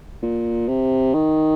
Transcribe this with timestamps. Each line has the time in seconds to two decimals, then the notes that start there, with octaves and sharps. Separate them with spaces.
0.22 A#2
0.68 C3
1.14 D#3